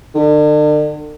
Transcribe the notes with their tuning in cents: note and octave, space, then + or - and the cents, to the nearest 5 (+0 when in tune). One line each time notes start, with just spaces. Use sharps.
D3 +40